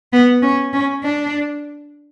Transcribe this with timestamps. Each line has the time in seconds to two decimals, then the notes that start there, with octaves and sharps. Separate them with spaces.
0.13 B3
0.43 C#4
0.73 C#4
1.03 D4